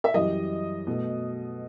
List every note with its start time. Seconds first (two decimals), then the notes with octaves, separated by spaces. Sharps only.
0.04 E5
0.14 F#2 E3 G3 D#5
0.87 B2 A3